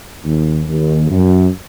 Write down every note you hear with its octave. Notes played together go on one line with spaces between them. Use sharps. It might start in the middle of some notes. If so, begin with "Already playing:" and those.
D#2
D#2
F#2